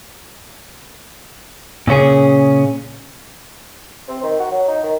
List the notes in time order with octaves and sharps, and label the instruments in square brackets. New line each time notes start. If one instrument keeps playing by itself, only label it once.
[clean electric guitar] A#2 C#3 C#4 G#4
[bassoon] C4
D#3
F#4
F#3
D#4
D#3